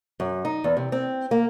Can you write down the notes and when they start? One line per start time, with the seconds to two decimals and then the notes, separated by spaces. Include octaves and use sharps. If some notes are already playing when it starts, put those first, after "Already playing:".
0.20 F#2
0.45 D#4
0.64 E2
0.77 C3
0.92 C4
1.31 A#3